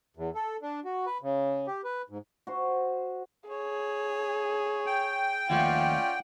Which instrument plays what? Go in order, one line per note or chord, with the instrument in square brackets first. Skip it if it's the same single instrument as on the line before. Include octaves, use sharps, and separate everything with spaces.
[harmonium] E2
A4
D4
F#4
B4
C#3
G4
B4
G#2
[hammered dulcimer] F#4 C5
[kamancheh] G#4 [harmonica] C#5
[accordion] G5
[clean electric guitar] D#2 F3 A3 [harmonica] C#4 F4 D5 [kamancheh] F#5